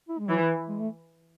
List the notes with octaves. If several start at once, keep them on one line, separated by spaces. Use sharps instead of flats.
E4
G#3
E3 F#3
E3
G#3
A3